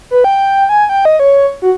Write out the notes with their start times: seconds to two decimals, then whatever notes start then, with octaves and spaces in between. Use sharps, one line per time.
0.11 B4
0.24 G5
0.69 G#5
0.89 G5
1.05 D#5
1.20 C#5
1.62 F#4